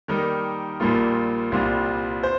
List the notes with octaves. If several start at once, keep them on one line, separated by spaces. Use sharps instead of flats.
D#3 G3 A#3 D#4 A#4
A#1 A#2 G3 A#3 F4
C2 A#2 G3 C4 F4
C5